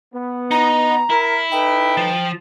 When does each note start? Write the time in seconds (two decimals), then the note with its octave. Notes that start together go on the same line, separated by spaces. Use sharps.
0.14 B3
0.51 D#4 D#5 A#5
1.10 E4 A#4
1.52 D#4 A4 B4 G5
1.97 F3